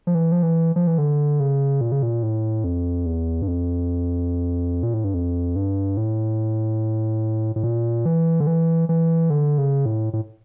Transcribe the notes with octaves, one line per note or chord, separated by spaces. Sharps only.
F3
E3
F3
E3
F3
E3
D3
C#3
A#2
C#3
A#2
A2
F2
E2
G2
F2
A#2
A2
G2
F2
G2
A2
A2
A#2
E3
D3
E3
E3
D3
C#3
A2
A2